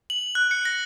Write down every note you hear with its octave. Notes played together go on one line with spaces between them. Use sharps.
F#7
F#6
C#7
A#6